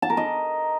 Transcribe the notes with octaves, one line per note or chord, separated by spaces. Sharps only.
A5
A#4
D#5